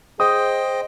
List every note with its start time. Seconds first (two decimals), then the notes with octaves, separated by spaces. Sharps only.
0.20 G#4 C5 D#5 G5 D#6